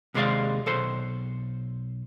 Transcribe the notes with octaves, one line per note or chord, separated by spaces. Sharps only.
D#2 C3 G#3 C5 D5 F5
B1 A4 C5